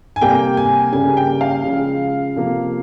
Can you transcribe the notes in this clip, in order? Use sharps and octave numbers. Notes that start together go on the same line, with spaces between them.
G#5
C3 G3 A#3 G5
G#5
C#3 G3 A#3 G#5
G5
F5
C#3 F3 G#3
C3 F3 A#3